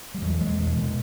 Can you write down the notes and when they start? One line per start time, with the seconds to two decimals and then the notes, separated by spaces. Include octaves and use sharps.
0.14 G3
0.22 E2 F#3
0.40 B2 G#3
0.58 E2 G#3
0.76 B2